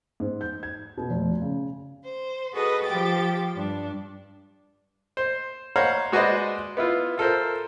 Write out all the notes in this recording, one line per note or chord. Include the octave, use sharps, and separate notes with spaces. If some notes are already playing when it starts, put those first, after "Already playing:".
G#2
G6
G#6
B2
F1
C#3
C5
F#4 G#4 A4 B4 D#5
F3 G4 G5 A6
G2 D4
C5
C5 C#5 F5 F#5 A#5
G#3 F#4 B4 C5 D5 D#5
B3 E4 F4
F4 A4 A#4 C5